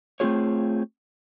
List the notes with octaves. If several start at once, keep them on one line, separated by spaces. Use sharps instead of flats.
A3 C4 F4 G#4 C#5